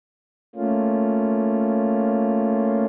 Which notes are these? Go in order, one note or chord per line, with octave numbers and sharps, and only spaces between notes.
A3 A#3 C#4 F4